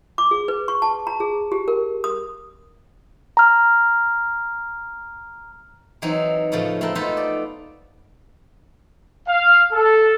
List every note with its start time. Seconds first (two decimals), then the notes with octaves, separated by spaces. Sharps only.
0.18 D6
0.31 G#4
0.48 B4
0.68 C#6
0.82 A5
1.07 A#5
1.20 G#4
1.52 G4
1.68 A#4
2.04 D#6
3.37 A#5 F6
6.02 E3 F#3 C4 D#4
6.52 A2 C#3 F3 A3
6.81 A3 C4 E4 A#4
6.95 B3 D#4 F4 A4 B4 C5
7.17 D5
9.28 F5
9.73 A4